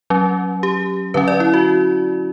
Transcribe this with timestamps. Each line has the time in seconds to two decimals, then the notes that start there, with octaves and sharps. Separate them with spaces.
0.10 F#3 C#4
0.63 G4
1.14 D3 F#3 C#4 B4
1.28 D5
1.40 E4
1.54 F#4